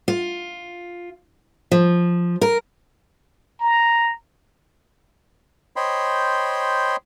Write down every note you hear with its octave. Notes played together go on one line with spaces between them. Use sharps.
F4
F3
A#4
A#5
C5 C#5 D#5 G5 B5 C6